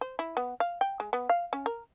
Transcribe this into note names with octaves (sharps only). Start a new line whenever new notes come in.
C5
E4
B3
F5
G5
G#3
B3
F5
C#4
A#4